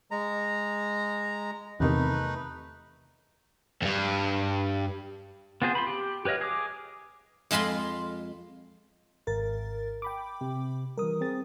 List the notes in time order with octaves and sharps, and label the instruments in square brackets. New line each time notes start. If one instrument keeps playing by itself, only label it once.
[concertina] G#3 A#5
[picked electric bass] E2 C3 D#3 [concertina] A3 D#4 B4
[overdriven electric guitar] E2 G2
[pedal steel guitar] B3 C4 F4 G#4 C5
B5 C6
G4
G4 B4 C#5 D#5 F5
G#4 D6
[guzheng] F2 G#3 F4 B5 C6
[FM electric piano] G#1 A#4 A6
G5 B5 D6
[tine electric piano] C3
[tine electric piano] E3 G3 [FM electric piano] A#4 D#6
[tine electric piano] C4 G#4 A6